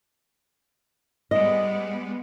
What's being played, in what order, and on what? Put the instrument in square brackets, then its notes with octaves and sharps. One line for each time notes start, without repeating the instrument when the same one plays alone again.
[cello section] G3 G#3 B3 [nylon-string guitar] D#5